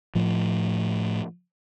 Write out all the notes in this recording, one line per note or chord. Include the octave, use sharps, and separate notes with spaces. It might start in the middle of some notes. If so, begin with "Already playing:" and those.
A2 F3